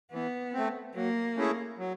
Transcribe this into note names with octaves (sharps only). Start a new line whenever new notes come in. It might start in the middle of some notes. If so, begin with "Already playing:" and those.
E3 B3
A3 C4
F#3 A#3
A3 C#4 E4 G#4
F#3